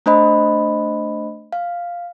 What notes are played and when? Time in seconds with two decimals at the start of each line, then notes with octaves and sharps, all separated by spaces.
0.06 A3 D4 C5 D#5 B5
1.53 F5